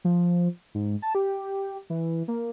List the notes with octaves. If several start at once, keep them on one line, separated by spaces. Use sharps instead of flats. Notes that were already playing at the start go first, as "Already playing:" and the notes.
F3
G#2
A5
G4
E3
A#3